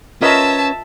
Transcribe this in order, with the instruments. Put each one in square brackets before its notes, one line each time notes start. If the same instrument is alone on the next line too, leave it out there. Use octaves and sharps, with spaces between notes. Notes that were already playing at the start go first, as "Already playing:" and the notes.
[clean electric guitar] C#4 B4 C#5 [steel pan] F4 A#4 D#5 [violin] E5 A5